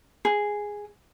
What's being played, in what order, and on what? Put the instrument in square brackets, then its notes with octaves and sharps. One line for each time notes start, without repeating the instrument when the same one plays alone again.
[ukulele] G#4